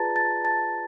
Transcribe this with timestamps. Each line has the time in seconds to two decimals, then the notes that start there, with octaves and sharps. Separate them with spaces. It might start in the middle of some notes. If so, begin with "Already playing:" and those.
Already playing: F4 G#4 B4 D5 A5 A#5 A6
0.16 A5 A6
0.44 A5 A6